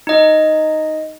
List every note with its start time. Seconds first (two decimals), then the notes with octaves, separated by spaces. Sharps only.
0.07 D#4 D#5